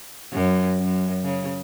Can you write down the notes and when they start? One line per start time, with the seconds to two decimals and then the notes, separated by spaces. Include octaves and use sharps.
0.33 F#2
0.78 F#2
1.24 C#3